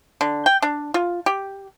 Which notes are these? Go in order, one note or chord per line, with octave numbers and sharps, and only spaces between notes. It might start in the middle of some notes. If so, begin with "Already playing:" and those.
D3
G5
D4
F4
G4